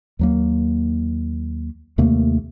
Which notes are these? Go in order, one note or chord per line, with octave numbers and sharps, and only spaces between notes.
D#2 F#3 A#3
D#2 C3 A3 A#3